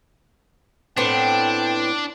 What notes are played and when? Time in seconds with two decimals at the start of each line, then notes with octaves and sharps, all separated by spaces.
0.97 A2 B3 C4 D4 G5